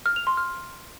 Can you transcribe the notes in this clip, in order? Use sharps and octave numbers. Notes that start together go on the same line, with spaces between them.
F6
F7
C6
F6